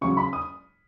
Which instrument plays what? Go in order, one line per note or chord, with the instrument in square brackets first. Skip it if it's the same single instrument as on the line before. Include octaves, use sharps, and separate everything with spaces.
[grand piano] C#3 F#3 C#4 [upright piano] C#6
[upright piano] B5
D#6